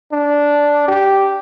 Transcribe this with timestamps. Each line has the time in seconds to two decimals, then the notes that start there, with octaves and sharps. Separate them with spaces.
0.12 D4
0.88 G4